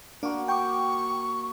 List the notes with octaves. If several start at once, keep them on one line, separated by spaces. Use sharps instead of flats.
A#3 D4 F#4
G5 C#6 D6